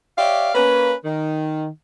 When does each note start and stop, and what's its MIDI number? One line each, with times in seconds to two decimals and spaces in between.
0.17 0.50 67
0.17 0.50 73
0.17 0.50 74
0.17 0.50 76
0.17 0.50 77
0.55 0.93 58
0.55 0.93 61
0.55 0.93 71
1.05 1.66 51